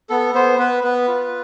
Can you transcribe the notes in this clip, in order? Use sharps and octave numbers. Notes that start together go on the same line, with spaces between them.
B3 A4
B3 C5
B3 B4
B3 B4
F4